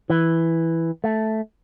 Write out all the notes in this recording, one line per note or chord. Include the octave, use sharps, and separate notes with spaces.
E3
A3